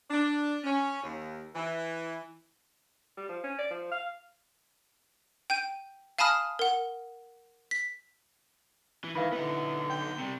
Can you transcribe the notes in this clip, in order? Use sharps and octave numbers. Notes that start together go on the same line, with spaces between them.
D4
C#4
D#2
E3
G3
F3
C#4
D5
F3
F5
G5 G6 D#7
F5 G#5 A5 B5 D#6 F6
A#4 F#5
B6
E3
D#3 E3 E4 B4 F5 B5
D3 B3 D#4 B4
G5
C3 G3